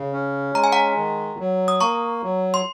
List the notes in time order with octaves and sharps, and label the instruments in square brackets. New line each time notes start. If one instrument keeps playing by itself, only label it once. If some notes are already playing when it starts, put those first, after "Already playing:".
Already playing: [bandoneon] C#3
C#4
[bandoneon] G#3 [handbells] A#5
[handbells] G#5
F#5 A#5
[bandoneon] D#3
F#3
[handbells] D#6
[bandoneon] A#3 [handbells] A#5 C#6
[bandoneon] F#3
[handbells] C6